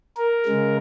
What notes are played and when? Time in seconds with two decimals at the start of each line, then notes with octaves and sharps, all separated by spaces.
0.17 A#4
0.45 C#3 G#3